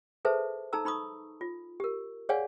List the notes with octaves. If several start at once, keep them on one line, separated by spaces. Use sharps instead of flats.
G#4 A4 B4 C5 E5 A5
D#4 A4 A5 A#5 E6
D#4 B5 C#6 D#6
F4
G4 A#4
G#4 C#5 D5 F5 F#5 G#5